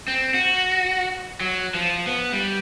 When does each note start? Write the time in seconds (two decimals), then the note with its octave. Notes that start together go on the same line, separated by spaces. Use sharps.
0.08 C4
0.34 F#4
1.41 F#3
1.74 F3
2.06 B3
2.33 G3